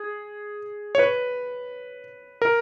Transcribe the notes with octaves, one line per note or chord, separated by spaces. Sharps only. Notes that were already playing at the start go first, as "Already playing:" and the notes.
Already playing: G#4
C#5
B4
A#4